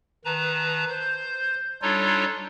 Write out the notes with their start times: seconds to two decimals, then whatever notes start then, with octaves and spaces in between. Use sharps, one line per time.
0.25 D#3 B4 A5 A#5
0.88 C5 G6
1.82 G3 D4 D#4 F4 A4 C#5